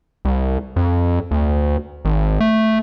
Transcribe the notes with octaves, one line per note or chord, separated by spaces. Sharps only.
C2
F2
D2
G#1
A3